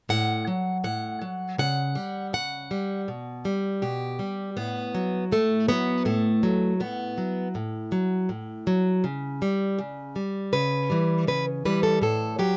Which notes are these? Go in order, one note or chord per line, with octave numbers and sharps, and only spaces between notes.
A2 F#5
F#3
A2 F#5
F#3
C#3 F#5
G3
C#3 F#5
G3
B2
G3
B2 G4
G3
A2 B3
F#3
A2 A3
F#3 B3
A2 A3
F#3
A2 B3
F#3
A2
F#3
A2
F#3
C#3
G3
C#3
G3
C#3 B4
E3 G3
C#3 B4
E3 G3 B4
A4
A2 A4
F#3 G4